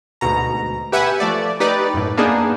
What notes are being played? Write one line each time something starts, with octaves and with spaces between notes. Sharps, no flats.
D2 G#2 B2 A#5
G4 B4 E5 F#5 G#5
F3 A3 D5
D#4 G4 B4 D5
F#2 A2
A#3 B3 D4 D#4 G#4